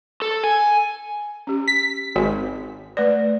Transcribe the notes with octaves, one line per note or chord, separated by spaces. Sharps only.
A4
G#5
C#4 G4
B6
G#1 F#4
A3 B4 D5